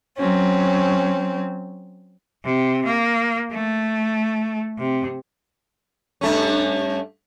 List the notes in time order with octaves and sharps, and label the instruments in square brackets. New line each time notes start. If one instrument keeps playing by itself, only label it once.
[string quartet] F#3 C4 C#4
[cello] C3
A#3
A3
C3
[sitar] G2 A3 C#4